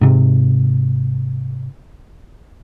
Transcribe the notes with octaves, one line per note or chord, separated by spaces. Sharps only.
G#2 C3